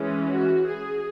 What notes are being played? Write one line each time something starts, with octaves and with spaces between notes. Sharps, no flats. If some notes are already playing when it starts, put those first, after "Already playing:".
Already playing: E3 G#3 C#4
F#4
G#4